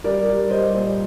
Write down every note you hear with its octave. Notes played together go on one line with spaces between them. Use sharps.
G3 A#4 D5
G3
G3 C5 D#5
A#2